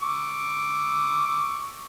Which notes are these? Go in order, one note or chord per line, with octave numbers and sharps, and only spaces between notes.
C#6 D6 E6